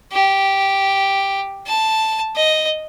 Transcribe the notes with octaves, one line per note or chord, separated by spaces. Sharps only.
G4
A5
D#5